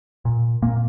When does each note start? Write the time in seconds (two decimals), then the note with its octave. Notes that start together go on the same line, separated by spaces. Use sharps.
0.25 A#2
0.62 A#2 A#3